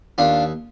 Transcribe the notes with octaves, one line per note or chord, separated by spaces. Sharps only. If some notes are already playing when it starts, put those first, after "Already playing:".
D#2 D4 F4